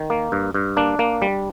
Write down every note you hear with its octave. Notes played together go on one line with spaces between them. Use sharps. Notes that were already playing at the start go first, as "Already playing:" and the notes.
Already playing: D#3
A#3
G2
G2
A#3 D4
A#3
G3